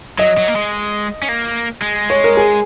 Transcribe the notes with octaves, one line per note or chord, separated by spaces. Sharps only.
F#3 D#5
F#3
A#3
G#3
C#4
A#3
G#3
C#5
A#4
G#4